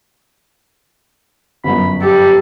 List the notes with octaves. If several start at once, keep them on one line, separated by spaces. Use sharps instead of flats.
G1 F#2 B5
G4 A4